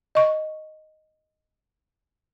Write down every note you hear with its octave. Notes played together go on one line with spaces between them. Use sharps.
D#5 C#6